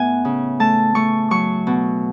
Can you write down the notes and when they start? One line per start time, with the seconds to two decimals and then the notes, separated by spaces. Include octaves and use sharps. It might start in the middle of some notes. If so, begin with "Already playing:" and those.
Already playing: A2 B3 B4 E5 F#5 G#5
0.25 C#3
0.60 A3 A5
0.95 A3 C#6
1.31 F#3 C#6
1.67 B2